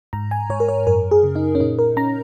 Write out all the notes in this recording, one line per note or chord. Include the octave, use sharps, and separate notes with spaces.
G#2 A#5
G#5
G#2 C#5
A#4
C#5
F#2 A#4
G#4
C#3
D#4
C#4
A#2 D#4
A#4
C#4 A#5